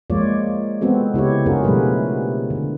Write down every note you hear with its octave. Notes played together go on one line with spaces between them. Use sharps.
F3 G#3 A#3 F4 C#5 D5
G#3 B3 C4 F#4 A4
C#3 E4 G4 C#5
C#4 D4 F4 F#4 G#4 A#4
B2 F3 G3 A3 B4
D3